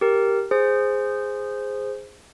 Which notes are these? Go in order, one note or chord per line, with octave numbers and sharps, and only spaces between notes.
G4 A#4
G#4 C5